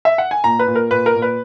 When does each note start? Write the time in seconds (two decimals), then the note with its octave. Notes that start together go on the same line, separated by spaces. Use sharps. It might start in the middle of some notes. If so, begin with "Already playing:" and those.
0.05 E5
0.18 F#5
0.31 G#5
0.44 A#2 A#5
0.59 B4
0.67 A#2
0.75 A#4
0.91 A#2 B4
1.06 A#4
1.15 A#2
1.22 B4